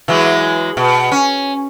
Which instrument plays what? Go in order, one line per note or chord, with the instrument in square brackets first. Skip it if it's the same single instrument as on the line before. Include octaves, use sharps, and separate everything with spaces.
[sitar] E3 F#3 G#3
B2
C#4